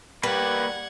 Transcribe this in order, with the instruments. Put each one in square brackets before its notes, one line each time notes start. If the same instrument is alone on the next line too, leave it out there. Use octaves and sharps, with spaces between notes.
[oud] G3 [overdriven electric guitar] A#3 G4 [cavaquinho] B4 [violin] F#5 G#6